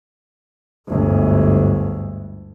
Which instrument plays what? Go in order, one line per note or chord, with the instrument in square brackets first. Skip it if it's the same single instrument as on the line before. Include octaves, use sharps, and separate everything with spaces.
[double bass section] G1 D2 G#2